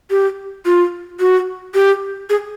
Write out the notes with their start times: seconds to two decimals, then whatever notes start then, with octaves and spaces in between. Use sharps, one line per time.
0.11 G4
0.65 F4
1.20 F#4
1.74 G4
2.30 G#4